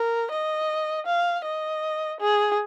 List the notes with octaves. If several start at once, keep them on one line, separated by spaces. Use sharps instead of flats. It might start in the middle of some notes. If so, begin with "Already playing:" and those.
Already playing: A#4
D#5
F5
D#5
G#4